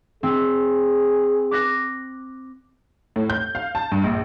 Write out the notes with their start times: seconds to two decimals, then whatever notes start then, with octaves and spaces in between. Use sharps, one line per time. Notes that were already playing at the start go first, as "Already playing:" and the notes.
0.23 C4 G#4
1.51 D6 F#6 A#6
3.16 A2
3.30 G6
3.55 F5
3.75 A5
3.92 G2
4.04 A#1